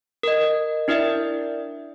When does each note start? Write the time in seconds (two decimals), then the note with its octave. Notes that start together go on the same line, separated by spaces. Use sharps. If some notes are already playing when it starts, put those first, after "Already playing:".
0.23 A#4 D#5
0.88 D4 E4 A#4 D5 E5